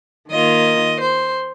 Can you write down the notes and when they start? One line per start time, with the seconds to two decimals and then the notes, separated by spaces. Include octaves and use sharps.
0.30 D#3 A#3 F4 D#5
1.01 C5